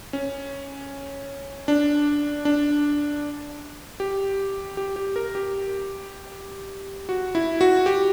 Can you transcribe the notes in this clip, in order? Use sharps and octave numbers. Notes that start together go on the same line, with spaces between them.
C#4
D4
D4
G4
G4
G4
A#4
G4
F#4
E4
F#4
G4